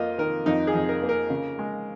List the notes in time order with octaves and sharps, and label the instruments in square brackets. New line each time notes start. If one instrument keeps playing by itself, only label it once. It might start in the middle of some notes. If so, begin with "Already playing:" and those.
Already playing: [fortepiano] F2 A#3 F4 D#5
D#3 A#4
F2 D#4
G#4
F2
A#4
A#3
A#4
C#3
G#3